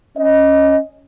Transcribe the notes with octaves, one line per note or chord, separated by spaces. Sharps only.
C#4 D#5